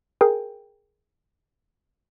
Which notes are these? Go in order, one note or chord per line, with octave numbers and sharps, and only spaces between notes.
G#4 A#4 G5